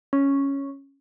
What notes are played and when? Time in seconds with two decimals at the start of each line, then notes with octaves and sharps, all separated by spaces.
0.13 C#4